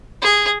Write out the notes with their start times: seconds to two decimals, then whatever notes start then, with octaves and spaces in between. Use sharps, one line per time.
0.22 G#4